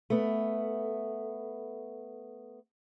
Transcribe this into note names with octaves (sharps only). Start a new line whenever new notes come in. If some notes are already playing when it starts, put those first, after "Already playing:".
A3 B3